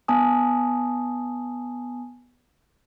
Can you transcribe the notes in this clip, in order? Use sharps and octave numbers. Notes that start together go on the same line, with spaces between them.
B3 G#5 A5 D#6